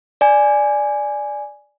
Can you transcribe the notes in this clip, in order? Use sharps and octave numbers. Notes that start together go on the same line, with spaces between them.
D5 G#5